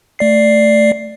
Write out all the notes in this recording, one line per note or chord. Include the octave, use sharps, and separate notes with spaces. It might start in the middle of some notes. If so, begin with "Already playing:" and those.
A3 D5 C7